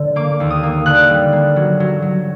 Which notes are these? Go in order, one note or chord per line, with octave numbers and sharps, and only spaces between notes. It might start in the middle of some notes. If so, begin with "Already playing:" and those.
Already playing: D3
A#3 D6
D#2
D#6
A#3
D3 F#6
G3
A#3
F#3
F#3
F#3